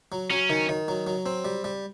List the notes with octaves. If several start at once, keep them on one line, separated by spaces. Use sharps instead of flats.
F#3
F#3 C#4
D#3
D#3
F#3
F#3
C4
G3
G3